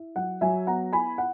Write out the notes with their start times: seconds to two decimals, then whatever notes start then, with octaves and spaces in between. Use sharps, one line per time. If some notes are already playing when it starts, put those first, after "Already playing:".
Already playing: E4
0.16 F#3 F#5
0.41 F#3 E5 G#5
0.67 B3 F#5 A#5
0.93 E4 G#5 B5
1.18 F#5